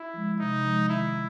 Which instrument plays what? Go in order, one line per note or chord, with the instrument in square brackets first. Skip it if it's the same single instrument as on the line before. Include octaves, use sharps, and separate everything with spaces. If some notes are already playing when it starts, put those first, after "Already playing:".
Already playing: [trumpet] E4
[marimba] F3 G#3
[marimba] C3 [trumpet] D#4
[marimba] F3 G#3
[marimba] D#3 [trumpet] E4